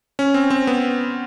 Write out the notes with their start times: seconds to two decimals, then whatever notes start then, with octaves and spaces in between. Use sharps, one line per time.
0.19 C#4
0.34 C4
0.50 C4
0.67 B3